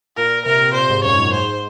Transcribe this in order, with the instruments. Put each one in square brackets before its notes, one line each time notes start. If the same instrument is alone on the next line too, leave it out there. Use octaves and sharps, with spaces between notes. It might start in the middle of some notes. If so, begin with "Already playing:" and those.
[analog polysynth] A#2 [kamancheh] A#4
[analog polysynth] C3 [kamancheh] A#4
[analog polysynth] A#2 [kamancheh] C5
[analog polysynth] G#2
[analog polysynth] F#2 [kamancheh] C#5
[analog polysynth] G#2
[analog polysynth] G#2 [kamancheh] C5